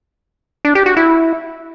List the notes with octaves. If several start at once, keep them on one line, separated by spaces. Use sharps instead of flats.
D4
G4
F#4
E4